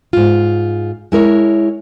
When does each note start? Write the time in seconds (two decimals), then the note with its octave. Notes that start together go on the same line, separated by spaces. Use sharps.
0.13 G#2 F4
1.12 G#3 E4 A#4 C#5